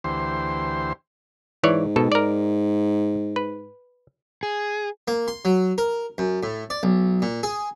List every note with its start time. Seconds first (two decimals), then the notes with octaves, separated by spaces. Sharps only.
0.04 D2 E3 G4 C5 C6
1.64 G#2 E3 C#5 D5
1.96 B2 A4
2.12 A#4 D5
3.36 B4
4.43 G#4
5.08 A#3
5.28 C6
5.45 F#3
5.78 A#4
6.18 F#2
6.43 A2
6.70 D5
6.83 B1
7.22 A#2
7.43 G#4